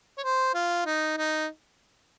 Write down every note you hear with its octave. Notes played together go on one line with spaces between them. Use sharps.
C#5
C5
F4
D#4
D#4